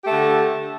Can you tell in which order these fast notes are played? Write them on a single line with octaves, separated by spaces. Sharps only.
G4 A3 D3